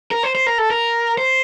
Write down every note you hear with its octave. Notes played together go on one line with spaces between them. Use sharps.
A#4
C5
C5
A#4
A4
A#4
C5